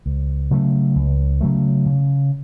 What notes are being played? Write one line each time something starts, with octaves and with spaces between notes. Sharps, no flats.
C#2
C#3 F#3 A3
C#2
C#3 F#3 A3
C#3